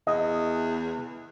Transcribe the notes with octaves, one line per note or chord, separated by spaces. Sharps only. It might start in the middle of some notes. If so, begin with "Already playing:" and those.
E2 D#5